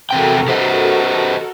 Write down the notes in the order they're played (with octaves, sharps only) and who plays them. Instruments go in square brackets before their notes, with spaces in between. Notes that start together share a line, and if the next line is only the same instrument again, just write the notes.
[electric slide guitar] E2 C3 G5 [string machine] F#4 A4 A#4
[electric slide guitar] G4 C5 D#5